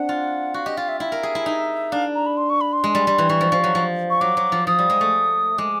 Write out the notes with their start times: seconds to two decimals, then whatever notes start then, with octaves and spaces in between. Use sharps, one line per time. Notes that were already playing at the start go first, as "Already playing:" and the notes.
Already playing: C4 D4 F#5
0.09 F4
0.54 F#4 F5
0.66 G4 D#5
0.77 F4 F5
0.88 E5
1.00 E4 E5
1.12 A#4
1.23 G#4
1.35 E4
1.46 D#4
1.92 D4 F5
2.15 A#5
2.26 B5
2.37 C6
2.50 C#6
2.61 B5
2.73 C6
2.84 G#3
2.95 G3
3.07 G3
3.18 E3
3.29 E3 C#6
3.41 F3
3.52 F3
3.64 F#3
3.75 F3
4.10 C#6
4.21 F#3 D6
4.37 F#3
4.52 F3
4.67 F3 D#6
4.78 G3
4.90 G#3
5.01 A3
5.58 G#3 D6